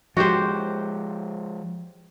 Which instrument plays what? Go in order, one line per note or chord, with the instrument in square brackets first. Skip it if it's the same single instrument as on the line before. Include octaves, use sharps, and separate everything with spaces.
[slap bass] F3 G#3 [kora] F#4 G4 C5